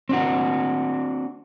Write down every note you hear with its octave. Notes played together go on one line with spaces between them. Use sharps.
C4 D4 F#4